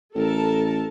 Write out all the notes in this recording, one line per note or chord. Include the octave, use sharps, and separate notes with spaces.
A1 A4 A#4 A5